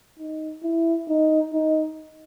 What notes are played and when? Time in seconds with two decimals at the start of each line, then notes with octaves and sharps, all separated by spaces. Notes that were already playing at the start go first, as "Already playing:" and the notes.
0.19 D#4
0.63 E4
1.09 D#4
1.54 D#4